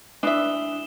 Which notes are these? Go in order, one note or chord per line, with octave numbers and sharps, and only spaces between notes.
E3 D4 E5 D#6 E7 G7